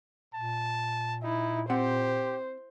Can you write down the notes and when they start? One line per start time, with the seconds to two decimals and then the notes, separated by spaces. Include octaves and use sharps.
0.34 A#2 A5
1.24 D#4 E4
1.70 C4 G4 C5 F#5